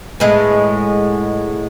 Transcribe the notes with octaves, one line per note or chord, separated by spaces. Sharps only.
A2 G#3 B3